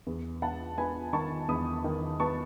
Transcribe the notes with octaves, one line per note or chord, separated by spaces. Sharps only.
E2
B3 F#5 A5
B3 G#5 B5
D#3 A5 C#6
E2 B5 D#6
D#3
B3 A5 C#6